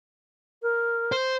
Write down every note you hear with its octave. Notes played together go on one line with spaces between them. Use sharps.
A#4
C5